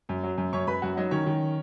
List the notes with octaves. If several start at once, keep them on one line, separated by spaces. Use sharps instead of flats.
F#2
F#3
F#2
F#2 C#5 C#6
F#2 B4 B5
F#2 F#4 F#5
F#3 D#4 D#5
D#3 C#4 C#5
D#3